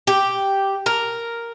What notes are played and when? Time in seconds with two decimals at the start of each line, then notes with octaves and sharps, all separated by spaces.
0.07 G4
0.86 A#4